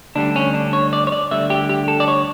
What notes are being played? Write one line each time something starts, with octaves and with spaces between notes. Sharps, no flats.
D2 D3 G3 D4
C#4
D4
C#5
D5
C#5
D5
D2 D3 G3 E5
G4
G4
A4
D5
C#5